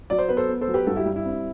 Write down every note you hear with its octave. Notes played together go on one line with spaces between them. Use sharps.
F#3 D5
C5
B3 B4
A4 C5
B3
A4 C5
F#3
G4 B4
G2 F#4 A4
E4 G4
G3
E4
C4